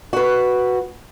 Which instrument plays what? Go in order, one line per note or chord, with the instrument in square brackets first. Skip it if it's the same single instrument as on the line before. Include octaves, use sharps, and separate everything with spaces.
[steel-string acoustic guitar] F#4 B4